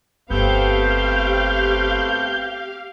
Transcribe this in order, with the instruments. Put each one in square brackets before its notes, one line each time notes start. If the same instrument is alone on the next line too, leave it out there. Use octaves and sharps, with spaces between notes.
[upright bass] G1 [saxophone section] A3 B3 C4 [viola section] G4 F5 [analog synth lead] G6